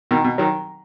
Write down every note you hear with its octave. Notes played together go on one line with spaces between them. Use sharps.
B2 D#3
B2
D#3 F#3